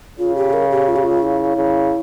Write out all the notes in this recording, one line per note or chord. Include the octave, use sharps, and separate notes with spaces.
C#3 F4
G4
A#4
G4
F4
G4
F4
E4
C#3